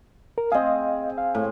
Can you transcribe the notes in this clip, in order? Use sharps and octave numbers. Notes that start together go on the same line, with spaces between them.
A#4
C4 G#4 D#5 F5
F5
A2